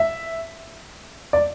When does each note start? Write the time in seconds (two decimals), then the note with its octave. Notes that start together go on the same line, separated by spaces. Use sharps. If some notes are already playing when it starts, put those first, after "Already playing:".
Already playing: E5
1.33 D5